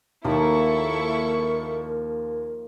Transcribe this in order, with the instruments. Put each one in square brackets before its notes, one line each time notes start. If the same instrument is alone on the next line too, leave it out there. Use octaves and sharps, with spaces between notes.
[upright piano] D#2 [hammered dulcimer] D#3 F3 A#3 [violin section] E4 A4 C#6 [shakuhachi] A#4